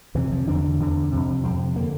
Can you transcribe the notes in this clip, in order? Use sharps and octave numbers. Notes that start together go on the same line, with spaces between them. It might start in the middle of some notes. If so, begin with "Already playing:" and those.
F2 C3 E3
F3
E2 D3 D4
E2 D3
F2 C3
F2 C3 C4
D3 A#3